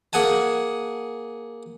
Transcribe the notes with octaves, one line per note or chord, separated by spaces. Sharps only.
A#3 G#4 F#5 G#5 A5